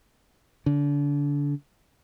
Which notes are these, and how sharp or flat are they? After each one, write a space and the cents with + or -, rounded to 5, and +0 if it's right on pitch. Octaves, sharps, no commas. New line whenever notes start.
D3 -30